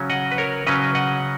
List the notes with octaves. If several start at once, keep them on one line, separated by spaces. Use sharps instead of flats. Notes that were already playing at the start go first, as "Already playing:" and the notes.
Already playing: C#3 F#3 C#4
D#5 F#5
B4
A#4 C#5
C#3 F#3 C#4 B4 D#5
D#5 F#5